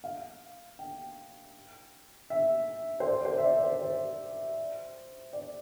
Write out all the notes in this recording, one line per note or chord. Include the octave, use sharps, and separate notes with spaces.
F5
G5
E5
C5
D5
C5
E5
D5
C5
C5
D5